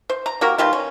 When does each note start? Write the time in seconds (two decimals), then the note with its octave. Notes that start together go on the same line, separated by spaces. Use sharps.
0.10 C5
0.26 A#5
0.41 A#3 F#4 G4 A#4
0.58 B2 D#3 G3 F4
0.73 C#4